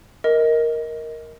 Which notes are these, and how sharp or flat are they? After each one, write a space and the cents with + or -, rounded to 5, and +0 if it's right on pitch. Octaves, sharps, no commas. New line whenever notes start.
A#4 +0 D#5 +20